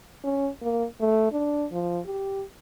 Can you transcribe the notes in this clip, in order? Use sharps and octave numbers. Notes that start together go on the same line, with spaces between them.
C#4
A#3
A3
D4
F3
G4